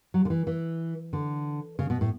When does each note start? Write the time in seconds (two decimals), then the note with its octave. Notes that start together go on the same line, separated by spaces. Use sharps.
0.14 F#3
0.25 D3
0.30 E3
0.47 E3
1.13 D3
1.79 C#3
1.90 B2
2.01 A2